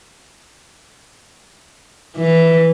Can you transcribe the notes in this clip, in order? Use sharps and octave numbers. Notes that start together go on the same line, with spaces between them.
E3